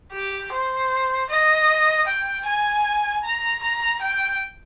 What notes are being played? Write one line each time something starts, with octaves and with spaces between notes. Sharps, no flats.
G4
C5
D#5
G5
G#5
A#5
A#5
G5